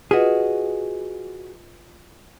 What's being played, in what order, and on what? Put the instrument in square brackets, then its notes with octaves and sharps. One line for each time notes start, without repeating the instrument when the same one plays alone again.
[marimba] F4 B4 D#5 [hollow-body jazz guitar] F#4 G#4